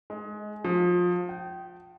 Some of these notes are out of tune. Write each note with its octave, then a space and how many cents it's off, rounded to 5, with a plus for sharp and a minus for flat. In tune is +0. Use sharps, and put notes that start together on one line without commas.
G#3 +20
F3 +25
G5 -25